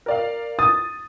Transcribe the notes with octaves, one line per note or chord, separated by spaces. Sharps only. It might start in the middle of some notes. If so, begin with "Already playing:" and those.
A#4 D5 F5
D#6 A6